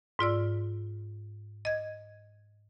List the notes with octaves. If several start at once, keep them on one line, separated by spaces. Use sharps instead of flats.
G#2 F4 D5 E6
D#5 G#6